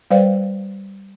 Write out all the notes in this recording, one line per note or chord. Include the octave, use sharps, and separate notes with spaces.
G3 B4 C5 D5 F5 G5